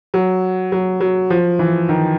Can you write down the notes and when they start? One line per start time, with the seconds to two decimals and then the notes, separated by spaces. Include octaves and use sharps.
0.14 F#3
0.72 F#3
1.01 F#3
1.30 F3
1.59 E3
1.89 D#3